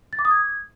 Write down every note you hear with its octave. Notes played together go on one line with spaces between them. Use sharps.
A6
D6
D#6
G#6